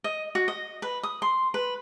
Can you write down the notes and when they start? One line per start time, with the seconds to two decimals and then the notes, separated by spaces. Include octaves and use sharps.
0.04 D#5
0.35 F#4
0.48 D#5
0.82 B4
1.03 D#6
1.22 C6
1.54 B4